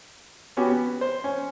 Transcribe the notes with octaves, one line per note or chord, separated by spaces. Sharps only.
B3 C#4 F#4 G4
B3
C5
C#4